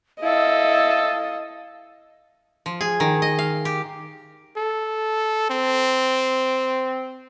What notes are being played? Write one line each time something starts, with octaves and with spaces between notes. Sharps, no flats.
E4 A4 D#5 F5
F3
G#4
D#3
D#5
F5
G4
A4
C4